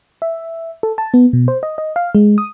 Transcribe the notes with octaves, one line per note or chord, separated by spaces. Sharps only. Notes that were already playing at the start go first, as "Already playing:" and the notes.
E5
A4
A5
B3
B2
C5
D#5
D#5
F5
G#3
D#6